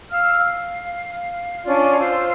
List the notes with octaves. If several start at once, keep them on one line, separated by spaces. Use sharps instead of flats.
F5 E6 F6
F5
C#4 D4 F4 D5
F4 C5 C6 E6